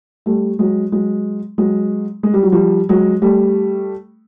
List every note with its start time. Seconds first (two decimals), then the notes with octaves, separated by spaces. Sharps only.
0.26 G3 A3
0.59 F#3 G#3
0.92 F#3 G#3
1.58 F#3 G#3
2.23 G#3
2.34 G3
2.43 F#3
2.52 F3 G3
2.89 F#3 G#3
3.22 G3 A3